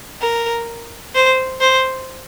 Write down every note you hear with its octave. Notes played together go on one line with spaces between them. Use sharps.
A#4
C5
C5